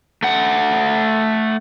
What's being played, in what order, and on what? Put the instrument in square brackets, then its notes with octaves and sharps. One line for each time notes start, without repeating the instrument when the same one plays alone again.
[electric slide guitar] A3 F#5